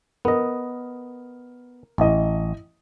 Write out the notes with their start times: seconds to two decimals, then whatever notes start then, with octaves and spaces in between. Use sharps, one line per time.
0.25 B3 A#4 D#5
1.98 A1 E4 D#5